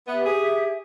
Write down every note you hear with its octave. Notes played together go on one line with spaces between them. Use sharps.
B3 G4 E5
G#4